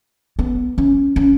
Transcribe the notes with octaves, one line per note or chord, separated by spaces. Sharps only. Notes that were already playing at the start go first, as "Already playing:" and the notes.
B3
C#4
C#4